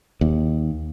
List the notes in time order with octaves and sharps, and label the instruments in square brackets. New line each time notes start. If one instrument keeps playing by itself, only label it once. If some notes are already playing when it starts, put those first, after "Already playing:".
[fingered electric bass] D#2